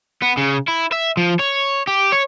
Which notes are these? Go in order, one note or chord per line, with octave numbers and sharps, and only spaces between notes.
B3
C#3
E4
E5
F3
C#5
G4
C#5